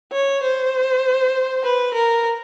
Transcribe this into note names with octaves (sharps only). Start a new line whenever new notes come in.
C#5
C5
B4
A#4